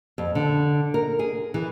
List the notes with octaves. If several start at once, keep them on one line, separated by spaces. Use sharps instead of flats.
F2
D3
A#4
G#4
E3